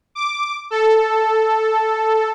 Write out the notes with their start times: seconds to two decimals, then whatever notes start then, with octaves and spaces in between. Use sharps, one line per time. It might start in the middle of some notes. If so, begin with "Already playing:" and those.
0.15 D6
0.70 A4